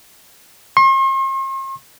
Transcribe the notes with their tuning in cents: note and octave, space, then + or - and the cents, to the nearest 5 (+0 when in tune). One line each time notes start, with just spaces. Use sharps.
C6 +45